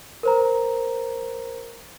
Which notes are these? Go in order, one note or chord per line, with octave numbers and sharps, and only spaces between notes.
A#4 C5 A#5